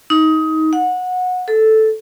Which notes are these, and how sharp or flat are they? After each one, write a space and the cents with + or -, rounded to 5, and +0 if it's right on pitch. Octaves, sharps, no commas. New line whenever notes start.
D#4 +20
F#5 -20
A4 -5